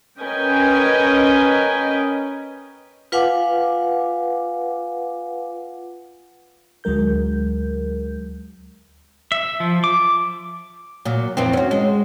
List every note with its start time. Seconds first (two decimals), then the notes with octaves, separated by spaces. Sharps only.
0.20 C#4 A#4 B4 D#5 G5 G#5
3.12 F4 B4 F5 F#5 G#5 D6
6.84 D2 F#3 G#3 A#4 G6
9.32 E5
9.60 F3
9.84 D6
11.05 A#2 F#3
11.37 F2 E3 C4
11.53 C#4 F#4
11.71 G#3